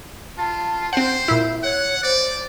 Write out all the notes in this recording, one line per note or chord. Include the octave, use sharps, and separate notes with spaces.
F4 A5
C4 C5 F#5
A#2 E4 E5
C#5 F#5
C5 D5